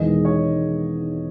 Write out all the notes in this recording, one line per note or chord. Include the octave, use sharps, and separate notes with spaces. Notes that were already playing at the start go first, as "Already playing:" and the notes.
Already playing: E1 E2 D#3 G#3 D#5
C#5